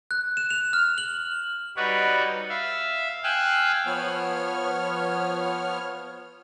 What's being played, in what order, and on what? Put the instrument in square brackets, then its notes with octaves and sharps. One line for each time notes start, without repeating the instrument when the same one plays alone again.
[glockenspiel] F#6
E7
F7
F6
F#7
[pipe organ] G3 D#4 F#4 B4 C#5 D5
E5 F5
F5 G5 G#5 E6 F#6
[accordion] F3 B3 C#5 F6